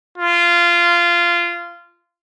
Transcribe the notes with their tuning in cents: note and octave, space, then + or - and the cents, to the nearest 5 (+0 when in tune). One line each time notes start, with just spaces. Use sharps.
F4 -15